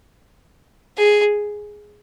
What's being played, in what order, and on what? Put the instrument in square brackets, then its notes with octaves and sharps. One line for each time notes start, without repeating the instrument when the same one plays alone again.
[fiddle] G#4